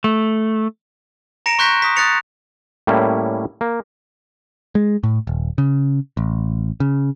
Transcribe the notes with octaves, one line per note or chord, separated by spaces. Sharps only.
A3
A#5 A#6 C#7 D7 E7
C6 C#6 F#6 G6 A#6 B6
D#6 B6
D#6 F#6 A6 A#6 C#7 F7
A2 G3 A#3 C#4 E4
A#3
G#3
A2
D#1
C#3
A1
C#3